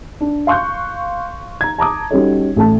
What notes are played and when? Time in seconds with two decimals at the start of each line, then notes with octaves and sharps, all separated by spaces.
0.21 D4
0.47 F5 C6 C#6 F#6 G6
1.61 A#5 G#6
1.79 A5 A#5 D6 D#6
2.11 G3 C#4 D#4 F#4 A4 C#5
2.56 A1 A3 A5